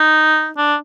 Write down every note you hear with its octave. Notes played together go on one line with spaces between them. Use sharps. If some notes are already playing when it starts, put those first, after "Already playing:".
Already playing: D#4
D4